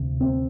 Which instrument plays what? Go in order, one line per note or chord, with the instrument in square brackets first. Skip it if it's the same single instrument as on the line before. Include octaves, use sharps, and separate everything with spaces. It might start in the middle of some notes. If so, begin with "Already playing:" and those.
Already playing: [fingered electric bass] D2 C3
C4